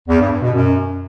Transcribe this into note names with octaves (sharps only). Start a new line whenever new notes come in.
E2
G2
G2
B2
F#2